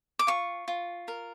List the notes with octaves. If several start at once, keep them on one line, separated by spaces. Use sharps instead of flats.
D6
F4 C#6
F4
A#4